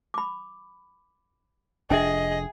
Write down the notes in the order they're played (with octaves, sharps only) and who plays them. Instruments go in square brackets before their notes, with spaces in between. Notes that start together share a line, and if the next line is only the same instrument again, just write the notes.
[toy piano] B5 D6
[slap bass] F1 D4 [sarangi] G#4 [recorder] D#5 [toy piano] E5 G5